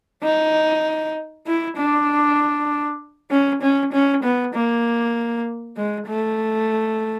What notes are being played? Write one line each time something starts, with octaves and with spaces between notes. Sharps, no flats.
D#4
E4
D4
C#4
C#4
C#4
B3
A#3
G#3
A3